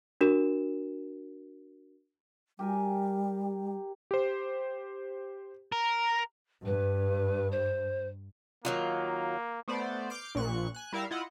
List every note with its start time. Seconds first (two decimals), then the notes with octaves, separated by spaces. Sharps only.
0.21 D4 F#4 A#4 E7
2.59 G3 G4 A#4 G#5
4.11 G4 C5
5.72 A#4
6.66 G2 B4
7.51 C5
8.65 D#3 F#3 A#3 F4
9.68 A3 B3 C5 D5
10.10 D6 F6 G6 C7 D7
10.35 A#1 A#2 C#6 F#6
10.75 G#5 F#6
10.93 G3 E4 A#4 E5 F5
11.11 E4 F4 D#5 F#5